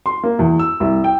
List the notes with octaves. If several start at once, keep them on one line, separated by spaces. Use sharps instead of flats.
C6
A#3
E2
E6
C2
G5